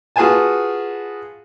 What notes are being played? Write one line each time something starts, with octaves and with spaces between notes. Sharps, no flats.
F4 F#4 G#4 B4 G#5 A5